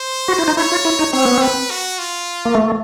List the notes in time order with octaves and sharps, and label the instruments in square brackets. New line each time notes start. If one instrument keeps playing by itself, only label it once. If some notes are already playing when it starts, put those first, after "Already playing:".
Already playing: [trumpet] C5
[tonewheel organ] F#4
E4
D#4
[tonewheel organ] E4 [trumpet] C#5
[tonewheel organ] F4
E4
D#4
[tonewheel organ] C4 [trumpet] C#5
[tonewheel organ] B3
[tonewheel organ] C4 [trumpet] B4
[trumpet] F#4
F4
[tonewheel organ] A#3
A3